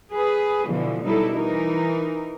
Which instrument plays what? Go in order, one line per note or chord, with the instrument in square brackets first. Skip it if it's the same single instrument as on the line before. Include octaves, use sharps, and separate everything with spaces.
[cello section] G#4 B4
B2 D3 E3 F3
B2 F#3 G3 D#4 E4 A4
E3 D#4 A#4